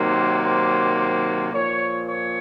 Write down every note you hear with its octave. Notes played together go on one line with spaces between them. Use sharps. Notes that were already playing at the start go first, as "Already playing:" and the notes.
Already playing: C3 D#3 F#3 A#3 C5
C5
C5
A#2 F3 A#3 C#5
C#5